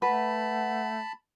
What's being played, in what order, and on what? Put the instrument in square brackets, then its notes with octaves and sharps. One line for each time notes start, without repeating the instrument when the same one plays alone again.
[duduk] A3 [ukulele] B4 [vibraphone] F#5 [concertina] A5 B5